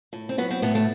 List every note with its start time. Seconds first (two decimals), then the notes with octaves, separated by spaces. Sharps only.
0.13 A2
0.29 C4
0.38 F#3 B3
0.50 C4
0.62 A2 B3
0.75 A3